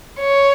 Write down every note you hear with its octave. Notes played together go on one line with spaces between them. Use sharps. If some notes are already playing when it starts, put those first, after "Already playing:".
C#5